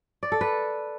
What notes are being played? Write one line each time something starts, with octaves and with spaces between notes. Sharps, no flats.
D5
A4
B4